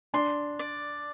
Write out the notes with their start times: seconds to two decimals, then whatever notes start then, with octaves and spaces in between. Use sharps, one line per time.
0.14 D4 C6
0.59 D5